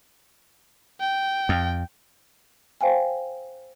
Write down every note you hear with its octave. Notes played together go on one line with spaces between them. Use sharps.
G5
F2
C5 F5 G5 G#5